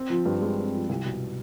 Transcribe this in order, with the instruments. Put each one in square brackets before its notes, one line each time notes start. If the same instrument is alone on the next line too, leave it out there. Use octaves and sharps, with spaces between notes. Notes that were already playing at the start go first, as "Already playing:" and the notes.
Already playing: [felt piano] C4
F3
G2
G#3
C4
F3
C2
B2